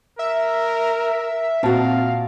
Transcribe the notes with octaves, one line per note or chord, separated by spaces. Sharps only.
A#4 E5
A#2 C4 F#4 F5 A5